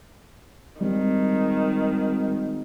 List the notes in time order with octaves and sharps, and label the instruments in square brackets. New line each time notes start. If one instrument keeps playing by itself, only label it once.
[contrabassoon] G#1 [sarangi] D#3 [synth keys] G3